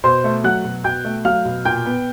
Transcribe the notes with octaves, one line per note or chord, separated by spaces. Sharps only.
B2 C5 C6
A3
F#3 F#5 F#6
B2
B2 G5 G6
A3
F#3 F5 F6
B2
A#2 G5 G6
B3